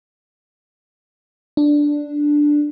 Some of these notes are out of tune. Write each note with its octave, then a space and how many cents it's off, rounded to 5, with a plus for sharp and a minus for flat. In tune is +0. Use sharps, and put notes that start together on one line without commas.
D4 +0